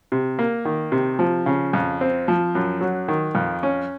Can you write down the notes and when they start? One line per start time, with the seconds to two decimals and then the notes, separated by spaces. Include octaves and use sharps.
0.12 C3
0.39 A#3
0.65 D#3
0.92 C3
1.19 F3
1.46 C#3
1.73 F2
2.01 C4
2.28 F3
2.55 F#2
2.81 F#3
3.08 D#3
3.35 F2
3.63 C#4